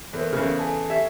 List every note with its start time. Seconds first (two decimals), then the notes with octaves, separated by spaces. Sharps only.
0.13 E2 A4 A#4 C5
0.33 E2 C#3
0.59 A4 G#5 A5
0.90 G4 E5 G#6 C7